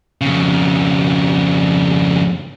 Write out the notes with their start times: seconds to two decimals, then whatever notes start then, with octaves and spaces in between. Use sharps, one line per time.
0.21 F2 C#3